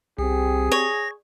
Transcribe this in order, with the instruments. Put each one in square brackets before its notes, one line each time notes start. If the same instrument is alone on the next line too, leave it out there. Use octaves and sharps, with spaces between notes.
[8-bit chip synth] C2 [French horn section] C4 G4 [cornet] G#4
[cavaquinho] C#5 [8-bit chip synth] A#6